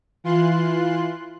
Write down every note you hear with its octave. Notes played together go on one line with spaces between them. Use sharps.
E3 F4 C6 F#6